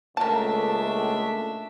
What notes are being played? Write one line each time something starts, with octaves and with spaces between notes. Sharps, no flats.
C#2 A#2 A3 D4 A#4 E5 A5